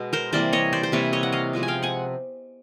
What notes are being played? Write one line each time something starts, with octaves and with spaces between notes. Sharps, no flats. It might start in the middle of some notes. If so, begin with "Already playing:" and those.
Already playing: B2 G#3 B3
A#4 C5
C3 E3 G3 A#3 C5 D5
C#5 D#5
C5 D5
C5
C3 E3 G3 A#3 B4 C#5
C#5 D#5
F#5
D#5 F5
C3 F3 G#3 B3
G#5
F5 G5
F#5 G#5